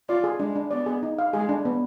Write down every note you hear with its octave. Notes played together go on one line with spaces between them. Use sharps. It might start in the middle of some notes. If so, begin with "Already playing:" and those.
F4 D5
G#4
G#3 D4
D4
B3 D5
G#4
D#4
F5
G#3 G#4
D4
B3